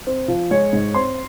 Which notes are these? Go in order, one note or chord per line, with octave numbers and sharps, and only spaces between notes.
C4
F3
G#3 C#5
G#2
C4 C6